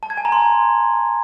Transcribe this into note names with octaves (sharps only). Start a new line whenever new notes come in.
A5
G#6
G#5
A#5
C6